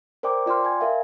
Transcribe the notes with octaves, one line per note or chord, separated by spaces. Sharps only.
A#4 C5 D5 G5 D6
F4 D5 G5 C6 F6
G#5 G#6
A#4 E5 F5